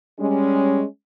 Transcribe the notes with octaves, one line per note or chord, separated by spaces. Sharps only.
G3 G#3 C#4